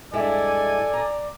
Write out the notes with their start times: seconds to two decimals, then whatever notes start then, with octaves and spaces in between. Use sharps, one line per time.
0.13 G2 G#3 E4 A4 D5 G#5
0.93 A#5